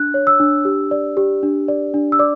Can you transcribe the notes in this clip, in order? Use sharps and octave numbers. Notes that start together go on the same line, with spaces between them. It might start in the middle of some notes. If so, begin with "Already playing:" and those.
Already playing: D4 F#6
C#5
E6
D4
G4
D5
G4
D4
D5
D4
E6
D5 D6